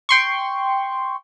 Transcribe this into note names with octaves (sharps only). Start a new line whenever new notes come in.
G5 C6 C#6